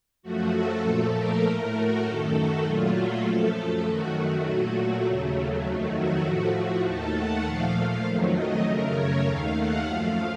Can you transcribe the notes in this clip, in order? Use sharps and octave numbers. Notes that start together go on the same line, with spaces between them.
F#2 F3 A3 F#4
A4
A#2 F3 A3 A4
A#4
A2 A3
F#4
F#2 D#3 A3 A4
F#4
A#2 F#3 A3 F4
F#4
F#2 F3 A3 A4
F#2 D#3 A3 F#4
F#4
A#2 F#3 A3
D#2 C#3 F#3 A3
F2 D#3 F#3 A3
F#4
A2 F3 A3
D#2 D#3 A3 A4
F#5
A#2 F3 A3 F5
F2 D#3 F#3 A3
D#5
F#2 C#3 A3 A#4
C#5
D#2 D#3 A3 F5
F#5
F#2 F3 A3 F5